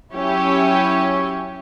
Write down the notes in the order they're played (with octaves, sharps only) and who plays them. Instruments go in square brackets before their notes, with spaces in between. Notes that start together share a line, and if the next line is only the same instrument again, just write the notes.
[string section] F#3 C#4 E4 G4 C#5